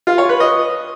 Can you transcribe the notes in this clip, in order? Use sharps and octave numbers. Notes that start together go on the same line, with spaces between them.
F4
C#5
B4
D#5